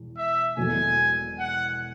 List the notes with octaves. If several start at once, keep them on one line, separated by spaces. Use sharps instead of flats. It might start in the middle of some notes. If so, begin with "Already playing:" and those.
Already playing: E1 E2
E5
E1 E2 B2 F#3 A3 G#5
F#5